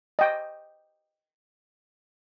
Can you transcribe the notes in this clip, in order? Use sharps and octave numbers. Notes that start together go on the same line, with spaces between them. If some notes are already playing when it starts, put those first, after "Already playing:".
D#5 G5